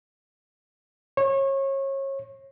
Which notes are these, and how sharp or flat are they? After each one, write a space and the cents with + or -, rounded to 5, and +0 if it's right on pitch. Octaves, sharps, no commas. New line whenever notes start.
C#5 -30